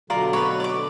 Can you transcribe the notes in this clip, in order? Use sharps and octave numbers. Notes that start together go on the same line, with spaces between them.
B2 D3 F#3 F4 A#4 D5
B4 C#5
D5 D6